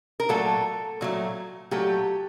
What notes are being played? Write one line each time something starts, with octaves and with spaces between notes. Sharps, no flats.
A#4
A#2 F#3 A3 A4
A#2 F#3 A3
A#2 F#3 A3 G4